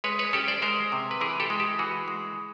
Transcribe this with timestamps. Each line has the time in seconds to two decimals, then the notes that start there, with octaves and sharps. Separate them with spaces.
0.04 G#3 B4 C#5
0.19 B4 C#5
0.33 C#4 G4 A4
0.48 C5 D5
0.62 G#3 A#4 C5
0.92 C3
1.11 B4
1.21 E3 G#4 A#4
1.40 G4 A4
1.50 G#3
1.60 G4 A4
1.79 E3 F#4 G#4
2.08 G#3